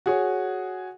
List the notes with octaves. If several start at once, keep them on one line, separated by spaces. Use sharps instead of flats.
F#4 G#4 C#5